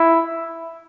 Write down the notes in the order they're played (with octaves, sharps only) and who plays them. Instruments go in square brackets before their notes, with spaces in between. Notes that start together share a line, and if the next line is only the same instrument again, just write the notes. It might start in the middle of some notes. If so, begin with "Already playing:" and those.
Already playing: [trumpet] E4